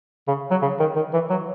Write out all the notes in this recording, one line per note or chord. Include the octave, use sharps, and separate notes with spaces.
C#3
F#3
C#3
D#3
D#3
E3
F#3